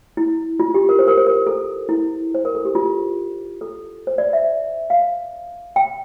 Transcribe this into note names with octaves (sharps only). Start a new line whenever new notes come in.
E4
F4
G4
A#4
C5
A#4
C5
A#4
A4
E4
C5
A#4
A4
G4
F4
A4
C5
D5
E5
F5
G5